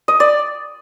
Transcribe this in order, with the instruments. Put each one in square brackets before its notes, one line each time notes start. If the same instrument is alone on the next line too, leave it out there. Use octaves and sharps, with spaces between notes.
[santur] D#5
D5